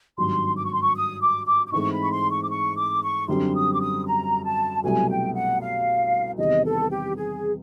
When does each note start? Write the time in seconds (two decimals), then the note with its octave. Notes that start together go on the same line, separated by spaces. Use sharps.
0.18 G#1 G2 D#3 F#3 C6
0.57 D6
0.65 C#6
0.73 C6
0.82 C#6
0.96 D#6
1.21 D6
1.46 D6
1.67 D6
1.72 G#2 E3 A3 C4 D#4 C#6
1.92 B5
2.03 C#6
2.12 C6
2.31 C#6
2.43 D6
2.50 C#6
2.77 D6
3.03 C#6
3.28 F#2 D3 G3 C4 C6
3.54 D#6
3.73 D6
3.80 D#6
4.06 A#5
4.45 A5
4.84 C2 B2 F#3 A3 G#5
5.09 G5
5.34 F#5
5.61 F5
6.38 E2 C3 D#3 G3 B3 D#5
6.65 A4
6.90 G4
7.17 G#4